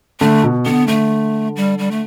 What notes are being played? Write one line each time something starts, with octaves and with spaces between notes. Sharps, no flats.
D3 A3
B2
D3 B3
D3 A3
G3
G3
A3